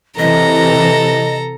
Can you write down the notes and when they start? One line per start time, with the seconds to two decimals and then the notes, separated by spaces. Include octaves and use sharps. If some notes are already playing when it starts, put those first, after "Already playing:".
0.19 C3 E3 A4 D#5 A#5